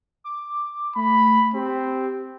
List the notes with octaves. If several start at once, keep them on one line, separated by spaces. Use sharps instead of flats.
D6
A3 B5
C4 G4